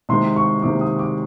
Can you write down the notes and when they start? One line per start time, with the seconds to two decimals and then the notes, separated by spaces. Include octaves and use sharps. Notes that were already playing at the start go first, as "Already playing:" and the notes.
0.09 C3 D#3 G#3 C6
0.36 C#6
0.62 C3 D#3 G#3 D6
0.81 D#6
0.99 D6